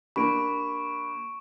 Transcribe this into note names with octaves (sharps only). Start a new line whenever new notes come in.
A#3 D4 G4 B5 C#6 D7